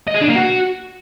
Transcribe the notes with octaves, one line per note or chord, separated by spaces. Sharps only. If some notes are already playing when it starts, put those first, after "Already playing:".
D#5
G#4
D4
A#3
F#4